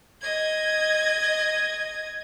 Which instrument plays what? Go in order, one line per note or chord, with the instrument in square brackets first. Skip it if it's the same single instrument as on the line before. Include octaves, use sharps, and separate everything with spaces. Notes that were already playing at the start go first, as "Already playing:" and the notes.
[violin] D#5 G#6